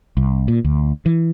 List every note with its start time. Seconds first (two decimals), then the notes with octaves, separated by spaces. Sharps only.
0.17 C2
0.48 A#2
0.64 D2
1.06 E3